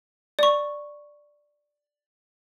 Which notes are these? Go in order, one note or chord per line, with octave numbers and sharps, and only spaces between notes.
D5 C#6